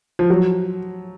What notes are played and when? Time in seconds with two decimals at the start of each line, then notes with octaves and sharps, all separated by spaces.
0.19 F3
0.30 F#3